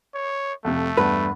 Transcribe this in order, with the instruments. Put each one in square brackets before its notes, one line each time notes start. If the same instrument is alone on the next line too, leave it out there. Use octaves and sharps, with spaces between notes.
[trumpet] C#5
[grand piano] F2 C3 [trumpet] A3
[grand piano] E2 G2 [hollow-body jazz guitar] B4